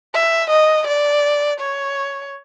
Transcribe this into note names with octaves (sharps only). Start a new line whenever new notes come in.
E5
D#5
D5
C#5